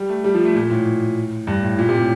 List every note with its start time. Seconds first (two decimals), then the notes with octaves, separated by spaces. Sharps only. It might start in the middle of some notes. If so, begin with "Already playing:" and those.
Already playing: G3
0.09 A3
0.24 G3
0.34 F3
0.45 A3
0.55 A#2
0.70 A2
1.47 G2
1.63 A2
1.79 A#2
1.89 C3
1.98 A2